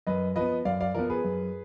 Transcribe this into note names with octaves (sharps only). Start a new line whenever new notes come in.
F#2 B4 D#5
F3 B3 B4 D#5
F#2 D5 F5
D5 F5
F3 B3 A#4 D5
G#4 B4
F#2